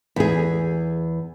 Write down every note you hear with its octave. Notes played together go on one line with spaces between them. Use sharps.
E2 G#4